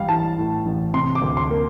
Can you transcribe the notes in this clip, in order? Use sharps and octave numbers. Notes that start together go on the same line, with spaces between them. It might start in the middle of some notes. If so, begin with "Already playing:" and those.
Already playing: A1 G3 F5
E3 A5
A2
A1
C3 C6
D6
D2
C6
A#3